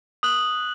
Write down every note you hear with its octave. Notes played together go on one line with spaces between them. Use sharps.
D#6 F#6 F#7